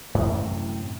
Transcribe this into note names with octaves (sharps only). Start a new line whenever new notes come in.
F#2 A2 C3 E3